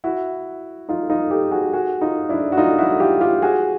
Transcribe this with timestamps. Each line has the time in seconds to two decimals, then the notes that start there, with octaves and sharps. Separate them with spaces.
0.04 E4 F#4
0.89 D#4 F4
1.10 D#4 F4
1.31 G4 A4
1.51 F#4 G#4
1.73 F#4 G#4
2.01 D#4 F4
2.29 D4 E4
2.52 F#4
2.57 D#4 F4
2.78 E4 F#4
3.00 F4 G4
3.21 F4 G4
3.42 F#4 G#4